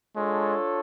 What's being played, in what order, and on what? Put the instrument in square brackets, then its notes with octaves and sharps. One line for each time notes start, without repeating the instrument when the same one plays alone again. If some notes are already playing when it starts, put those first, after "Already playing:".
[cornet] G#3 [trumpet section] D4 F4 A4 C#5